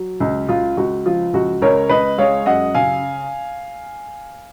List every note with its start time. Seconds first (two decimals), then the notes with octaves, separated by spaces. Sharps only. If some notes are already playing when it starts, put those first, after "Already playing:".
Already playing: F#3
0.20 C#2
0.49 C#2 F4
0.77 C#2 F#4
1.06 F3 F4
1.34 C#2 F#4
1.62 C#2 A#4 C#5
1.89 C#2 B4 D#5
2.18 G#3 C#5 F5
2.46 F#2 D#5 F#5
2.74 C#3 F5 G#5